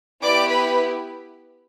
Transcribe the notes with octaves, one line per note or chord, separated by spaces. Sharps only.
B3 E4 G4 D5 D6
B4 B5